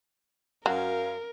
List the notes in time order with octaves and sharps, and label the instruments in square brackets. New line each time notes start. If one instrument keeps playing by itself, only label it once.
[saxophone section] F#2 F5 [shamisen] F#3 [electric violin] A#4